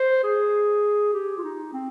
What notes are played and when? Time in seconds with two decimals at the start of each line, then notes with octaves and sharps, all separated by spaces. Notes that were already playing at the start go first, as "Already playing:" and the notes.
Already playing: C5
0.23 G#4
1.13 G4
1.38 F4
1.43 D#4
1.73 C4